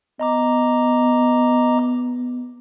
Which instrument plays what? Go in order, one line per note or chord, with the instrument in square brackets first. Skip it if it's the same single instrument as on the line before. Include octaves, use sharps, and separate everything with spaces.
[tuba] B3 [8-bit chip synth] D#5 A#5 D6